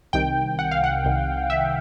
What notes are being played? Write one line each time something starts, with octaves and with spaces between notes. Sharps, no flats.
C2 C3 D#3 G5
F#5
F5
F#5
C2 C3 D#3
E5